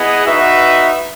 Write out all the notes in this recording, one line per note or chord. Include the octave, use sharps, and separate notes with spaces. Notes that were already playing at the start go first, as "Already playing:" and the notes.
Already playing: B3 E4 G#4 D#5 F#5
D#4 F#4 B4 E5